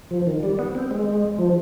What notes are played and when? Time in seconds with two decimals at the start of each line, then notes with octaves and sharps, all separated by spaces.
0.11 F3
0.27 D#3
0.43 G3
0.59 B3
0.75 C4
0.91 G#3
1.38 F3